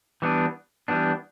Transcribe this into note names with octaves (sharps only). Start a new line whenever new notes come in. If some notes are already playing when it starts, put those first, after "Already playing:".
E3 G3 B3 D4
E3 G3 B3 D4